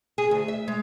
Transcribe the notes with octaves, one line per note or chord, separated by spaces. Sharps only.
G#4
D2
E5
G#3